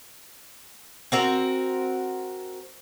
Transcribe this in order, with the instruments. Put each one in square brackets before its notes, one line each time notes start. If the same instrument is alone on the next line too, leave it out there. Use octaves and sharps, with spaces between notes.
[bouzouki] C4 F#4 A#4